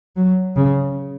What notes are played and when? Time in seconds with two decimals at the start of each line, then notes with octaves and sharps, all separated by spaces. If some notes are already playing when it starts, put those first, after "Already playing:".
0.16 F#3
0.56 C#3